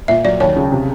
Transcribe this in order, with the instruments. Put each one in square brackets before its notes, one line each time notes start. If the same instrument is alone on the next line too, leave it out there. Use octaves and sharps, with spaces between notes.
[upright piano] A#2 [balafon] E5
[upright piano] F#3 [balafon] D5
[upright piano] D#2 [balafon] C#5
[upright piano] C#3
C3